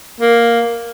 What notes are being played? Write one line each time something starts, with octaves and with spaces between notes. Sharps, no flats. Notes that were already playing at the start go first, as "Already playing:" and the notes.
A#3